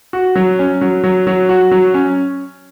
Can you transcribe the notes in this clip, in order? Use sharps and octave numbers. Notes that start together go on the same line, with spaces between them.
F#4
F#3
C#4
F#3
F#3
F#3
F#4
F#3
C#4